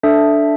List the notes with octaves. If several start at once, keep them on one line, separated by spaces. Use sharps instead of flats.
D4 A4 E5